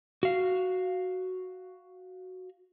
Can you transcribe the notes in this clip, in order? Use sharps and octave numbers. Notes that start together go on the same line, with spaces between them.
F#4 F5